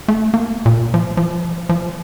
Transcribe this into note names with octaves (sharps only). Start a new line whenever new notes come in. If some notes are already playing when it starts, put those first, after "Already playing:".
A3
A#3
A#2
F3
F3
F3